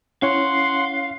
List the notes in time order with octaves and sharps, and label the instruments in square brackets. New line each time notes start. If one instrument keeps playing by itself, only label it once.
[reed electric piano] C#4 E4 C#5 [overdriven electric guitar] F5 [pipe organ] F#5 C6